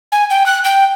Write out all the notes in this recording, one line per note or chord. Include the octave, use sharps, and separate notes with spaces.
G#5
G5
F#6
G5